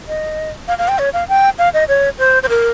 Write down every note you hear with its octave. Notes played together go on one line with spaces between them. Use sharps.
D#5
F5
F5
G5
C#5
F5
G5
F5
D#5
C#5
C5
C5
A#4